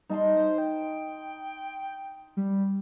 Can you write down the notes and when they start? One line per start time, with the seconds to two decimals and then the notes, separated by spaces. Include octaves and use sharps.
0.09 G3 D#4 A5 C6
0.37 C5
0.58 G5
2.37 G3